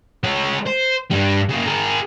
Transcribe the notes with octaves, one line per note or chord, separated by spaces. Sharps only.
G#3 C#5
C5
G2 G3
C#3 A#3
G#4 A#4